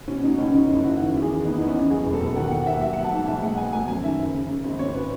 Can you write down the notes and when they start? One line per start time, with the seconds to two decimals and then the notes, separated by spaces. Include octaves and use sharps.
0.08 B2 C#4
0.23 B2 D#4
0.38 C#2 C#4
0.54 C#3 D#4
0.68 F#1 E4
0.79 E4
0.84 F#1 F#4
0.99 D#3 E4
1.14 E2
1.22 G#4
1.29 D#3
1.45 B3 D#4
1.52 E4
1.60 E2 D#4
1.68 C#4
1.75 B3
1.90 F#3 G#4
2.06 E1
2.13 A4
2.21 E1
2.36 D#2 F#5
2.51 D#2 F#5
2.66 D#2 E5
2.81 F#3 E5
2.93 B3 F#5
3.04 A5
3.12 G#2
3.27 B1 E5
3.42 G#3 F#5
3.57 B3 G#5
3.73 A3 G#5
3.88 F#2 G#5
4.03 D#3 E5
4.18 F#1
4.33 C#3
4.49 C#3
4.64 G#1
4.79 G#1 C#5
4.94 B4